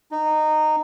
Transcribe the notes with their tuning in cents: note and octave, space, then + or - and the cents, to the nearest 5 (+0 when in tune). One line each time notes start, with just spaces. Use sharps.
D#4 -15